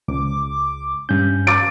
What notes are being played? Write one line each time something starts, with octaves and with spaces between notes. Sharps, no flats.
C#2 D6
G2 C#4 G6
F5 D6 A6 D7